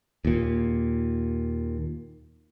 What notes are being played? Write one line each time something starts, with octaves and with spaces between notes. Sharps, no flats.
D#2 A#2